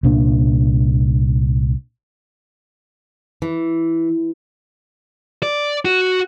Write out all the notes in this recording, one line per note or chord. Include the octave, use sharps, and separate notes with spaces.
C2 A#2 D4
E3
D5
F#4